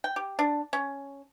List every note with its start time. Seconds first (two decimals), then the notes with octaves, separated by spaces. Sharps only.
0.04 G5
0.16 G4
0.39 D4
0.73 C#4